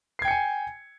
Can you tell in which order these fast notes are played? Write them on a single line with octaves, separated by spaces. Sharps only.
C7 G#6 G5 C#7 G#5